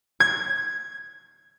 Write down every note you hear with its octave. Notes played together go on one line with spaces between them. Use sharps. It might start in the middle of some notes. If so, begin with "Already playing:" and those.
G#6